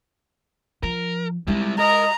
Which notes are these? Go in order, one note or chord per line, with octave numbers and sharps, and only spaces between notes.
F3 A#4
G3 G#3 E4 F4
A#4 D#5 A#5